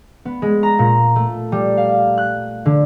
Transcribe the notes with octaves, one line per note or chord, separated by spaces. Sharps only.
B3
G#3
A#5
A#2
A3
G3
F5
F#6
D3